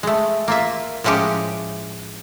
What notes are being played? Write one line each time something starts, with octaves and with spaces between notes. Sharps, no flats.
G#3 A3
A#3 F4 E5
A2 F3 G#3 C#4 G4